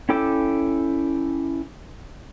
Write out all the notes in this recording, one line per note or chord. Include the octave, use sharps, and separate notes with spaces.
C#4 E4 A4 G5 D6